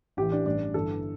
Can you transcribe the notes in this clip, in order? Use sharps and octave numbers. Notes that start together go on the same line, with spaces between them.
A1 A2 E3 G4
D4
A1 G2 E3 D4
G1 G2 E3 A4